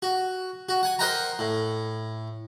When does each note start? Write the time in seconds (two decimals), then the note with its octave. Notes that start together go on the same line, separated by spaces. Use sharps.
0.02 F#4
0.69 F#4
0.83 F#5 G#5
0.99 A#4 C5 D#5 F#5 G5 A#5
1.39 A2